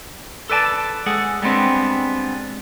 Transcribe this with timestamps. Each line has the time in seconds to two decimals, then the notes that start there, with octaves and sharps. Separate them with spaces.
0.50 A4 B4 D5 G#5 A5
1.06 G#3 G#4 A4 F#5
1.42 G3 G#3 B3 C4 D4